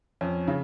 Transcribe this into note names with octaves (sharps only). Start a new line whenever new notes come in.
F2 C#4
C#3